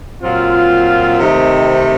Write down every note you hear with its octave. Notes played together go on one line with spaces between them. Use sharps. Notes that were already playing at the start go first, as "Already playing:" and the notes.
A#2 F#3 C4 F4
C3 D#3 A3 C4 D#4